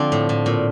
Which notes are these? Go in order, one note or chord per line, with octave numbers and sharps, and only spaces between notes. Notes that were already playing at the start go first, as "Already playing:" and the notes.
Already playing: D3 F3 C4 D5
A2
A2
A#2